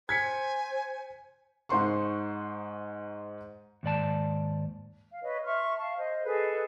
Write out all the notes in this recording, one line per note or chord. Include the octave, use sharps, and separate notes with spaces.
C5 G#5 G#6 B6 C#7
G#2 D#4 C5 F#5 C6 C#6
D#2 G#2 D5 A5
F5
B4 C#5 D#5
E5 C6 C#6 F6
F5 A5 C#6
C5 D#5
G#4 A4 B4 D#5